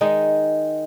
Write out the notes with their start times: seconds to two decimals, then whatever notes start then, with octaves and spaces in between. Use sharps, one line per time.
0.01 D#3 G#3 D#4